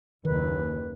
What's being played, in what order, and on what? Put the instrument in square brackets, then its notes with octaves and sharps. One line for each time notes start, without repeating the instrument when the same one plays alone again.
[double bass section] F#1 D#2 [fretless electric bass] D#3 [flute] B4